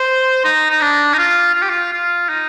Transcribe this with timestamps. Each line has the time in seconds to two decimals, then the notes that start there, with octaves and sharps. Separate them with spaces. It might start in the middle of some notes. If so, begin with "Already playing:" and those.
Already playing: C5
0.44 D#4
0.70 D#4
0.81 D4
1.14 D#4
1.18 F4
1.55 F4
1.62 G4
1.70 F4
1.93 F4
2.29 D#4